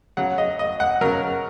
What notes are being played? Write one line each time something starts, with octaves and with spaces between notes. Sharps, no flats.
C#3 F#3 F#5
D#5
D#5
F#5
C#3 F#3 A#4